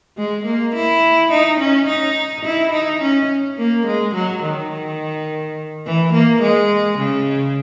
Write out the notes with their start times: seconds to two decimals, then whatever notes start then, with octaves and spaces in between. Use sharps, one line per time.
0.18 G#3
0.46 A#3
0.75 E4
1.31 D#4
1.60 C#4
1.88 D#4
2.45 E4
2.72 D#4
3.01 C#4
3.58 A#3
3.86 G#3
4.15 F#3
4.43 D#3
5.85 E3
6.13 A#3
6.42 G#3
6.98 C#3